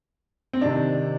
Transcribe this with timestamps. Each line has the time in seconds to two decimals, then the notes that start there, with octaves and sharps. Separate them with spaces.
0.53 C4
0.61 C3 D#3 D4